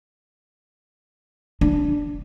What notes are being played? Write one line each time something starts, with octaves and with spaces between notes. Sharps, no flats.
D4